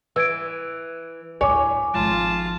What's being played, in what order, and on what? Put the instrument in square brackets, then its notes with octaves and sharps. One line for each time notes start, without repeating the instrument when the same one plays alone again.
[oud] E3 [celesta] E6 G#6 D7
[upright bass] D2 A2 [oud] C#5 [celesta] G#5 D6
[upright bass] G#1 F3 [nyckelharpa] F4 A5